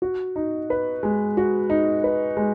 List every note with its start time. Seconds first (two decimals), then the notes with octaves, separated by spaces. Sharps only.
0.02 F#4
0.36 D#4
0.70 B4
1.03 G#3
1.37 F#4
1.70 D#4
2.04 B4
2.37 G#3